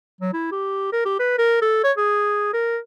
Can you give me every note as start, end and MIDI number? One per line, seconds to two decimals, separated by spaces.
0.21 0.33 54
0.33 0.49 64
0.52 0.90 67
0.93 1.03 70
1.05 1.18 67
1.19 1.34 71
1.38 1.58 70
1.62 1.79 69
1.84 1.92 73
1.97 2.53 68
2.53 2.78 70